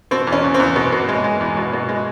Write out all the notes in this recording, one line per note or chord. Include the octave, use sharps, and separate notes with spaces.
B2 C4
E2
C#4
E2
C4
E2
B2
B2
G#3
G#3
E2
B2
B2
G#3